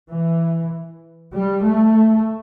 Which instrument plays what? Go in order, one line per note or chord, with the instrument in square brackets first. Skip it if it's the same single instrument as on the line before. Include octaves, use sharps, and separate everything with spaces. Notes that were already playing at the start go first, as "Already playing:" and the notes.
[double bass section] E3
G3
A3